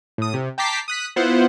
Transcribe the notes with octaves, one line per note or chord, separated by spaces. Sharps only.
A2 D#6
C3
G5 A5 A#5 D6 B6 C7
D#6 F#6 B6
B3 E4 F4 C5 F#5